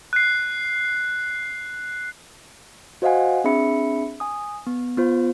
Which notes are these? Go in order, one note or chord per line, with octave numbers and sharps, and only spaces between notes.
F#6 C7
F#4 C5 D#5 F5 F#5 G#5
C4 D4 G#4 E5 B5 C#7
G#5 D#6
B3
B3 F4 C5